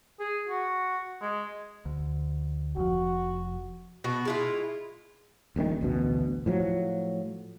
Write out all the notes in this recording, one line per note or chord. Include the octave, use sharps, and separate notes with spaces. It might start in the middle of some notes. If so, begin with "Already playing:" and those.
G#4
F#4
G#3
D2
F1 F3 F#4
B2 F#4
G#3 E4 F4
D#1 A#1 G#2 D#3
A1 D2 B2
A2 F3 F#3